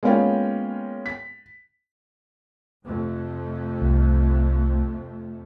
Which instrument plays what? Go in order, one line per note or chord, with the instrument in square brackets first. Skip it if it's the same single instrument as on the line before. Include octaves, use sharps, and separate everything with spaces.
[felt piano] G#3 A#3 B3 C#4 F4 G5
B6
[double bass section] F2 C3 A3
[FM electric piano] C2